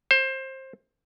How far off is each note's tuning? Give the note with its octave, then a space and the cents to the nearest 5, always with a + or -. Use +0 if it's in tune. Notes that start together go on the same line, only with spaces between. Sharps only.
C5 +20